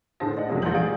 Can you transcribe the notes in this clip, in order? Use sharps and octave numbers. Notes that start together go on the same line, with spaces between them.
A2 D3 G#4 C5 A5 A#6
D5 D#5 F#5
F2 C3 F#3 G#3 A#3 C#4
A#1 E3 F#5 A#5 G6 F#7
G#4 D5 F5 D7